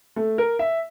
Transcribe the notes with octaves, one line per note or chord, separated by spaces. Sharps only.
A3
A#4
E5